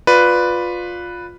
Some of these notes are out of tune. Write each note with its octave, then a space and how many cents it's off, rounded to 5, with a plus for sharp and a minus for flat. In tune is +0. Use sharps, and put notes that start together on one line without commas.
F4 +15 B4 +0 D5 +0